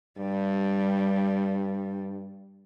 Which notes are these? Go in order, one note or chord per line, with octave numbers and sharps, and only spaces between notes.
G2 G3